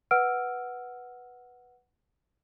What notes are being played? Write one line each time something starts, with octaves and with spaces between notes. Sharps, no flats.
B4 F#5 E6 F6 D7